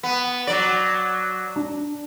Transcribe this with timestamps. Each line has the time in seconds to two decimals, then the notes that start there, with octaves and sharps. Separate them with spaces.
0.03 B3
0.47 F#3 D5
1.56 D4